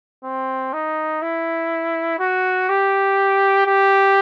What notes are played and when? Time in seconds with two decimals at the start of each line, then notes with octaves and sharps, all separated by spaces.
0.24 C4
0.73 D#4
1.22 E4
2.19 F#4
2.69 G4
3.66 G4